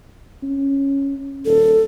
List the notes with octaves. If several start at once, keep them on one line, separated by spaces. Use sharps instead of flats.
C#4
D#1 A4